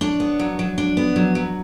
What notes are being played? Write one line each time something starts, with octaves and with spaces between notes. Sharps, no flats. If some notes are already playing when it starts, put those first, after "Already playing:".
D4 C#5
B3
F#3
F#3
D4
B3
F#3
F#3